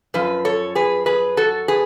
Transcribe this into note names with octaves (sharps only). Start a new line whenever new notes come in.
F#2 F3 B4
A4 C#5
G#4 B4
G#4 B4
F#4 A4
G#4 B4